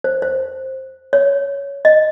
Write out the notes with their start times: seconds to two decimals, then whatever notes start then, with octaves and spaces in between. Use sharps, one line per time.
0.04 C5
0.22 C5
1.13 C#5
1.85 D#5